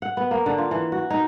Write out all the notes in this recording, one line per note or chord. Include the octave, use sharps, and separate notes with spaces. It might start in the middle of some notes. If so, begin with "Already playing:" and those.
F#5
B3
A#3
D3
F4
E3
F#4
D#4